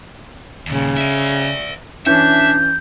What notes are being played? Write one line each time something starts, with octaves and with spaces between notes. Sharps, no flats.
D#2 A#2 C#3
D5 E5
E3 C#4 D4 E5 G6